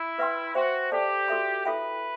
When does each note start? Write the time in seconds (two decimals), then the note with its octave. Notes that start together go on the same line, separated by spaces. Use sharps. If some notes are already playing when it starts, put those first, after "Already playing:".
Already playing: E4
0.18 B4 E5 G5 C6
0.55 F#4 C5 E5 G5 C6
0.91 G4 A4 D5 A5
1.28 F#4 A4 E5 B5
1.65 E4 A4 B4 E5 G5